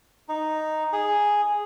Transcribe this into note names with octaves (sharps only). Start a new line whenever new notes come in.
D#4
G#4